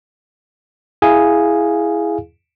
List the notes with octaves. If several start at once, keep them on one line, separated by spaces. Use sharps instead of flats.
E4 G#4 F5 G#5